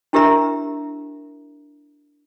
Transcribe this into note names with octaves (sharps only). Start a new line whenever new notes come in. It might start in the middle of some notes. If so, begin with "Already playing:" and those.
D4 E4 G4 A#4 E5 A#5